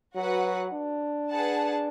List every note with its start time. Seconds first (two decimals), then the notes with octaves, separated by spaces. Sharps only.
0.15 F#3 F#4 B4 F#5
0.73 D4
1.30 G#4 B4 F#5 A5